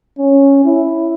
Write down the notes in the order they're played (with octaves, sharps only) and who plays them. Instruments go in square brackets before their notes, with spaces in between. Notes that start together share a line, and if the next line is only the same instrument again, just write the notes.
[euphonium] C#4
E4